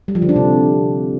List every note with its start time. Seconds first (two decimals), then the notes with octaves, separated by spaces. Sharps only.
0.08 G3
0.15 F3
0.22 D3
0.29 D4
0.36 C3